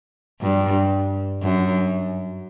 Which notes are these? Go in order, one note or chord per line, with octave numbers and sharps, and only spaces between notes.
G2
F#2